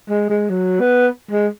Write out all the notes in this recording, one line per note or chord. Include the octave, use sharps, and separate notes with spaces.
G#3
G#3
F#3
B3
G#3